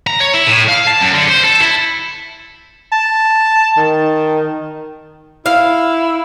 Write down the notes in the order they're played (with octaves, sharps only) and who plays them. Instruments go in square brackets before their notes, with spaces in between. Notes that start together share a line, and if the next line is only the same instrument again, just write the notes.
[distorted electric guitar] A#5
C#5
E4
A2
F5
A5
F#2
D3
C5
A4
E4
[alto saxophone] A5
D#3
[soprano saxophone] E4 [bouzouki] F5